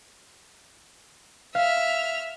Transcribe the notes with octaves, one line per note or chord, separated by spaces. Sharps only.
E5 F5 F6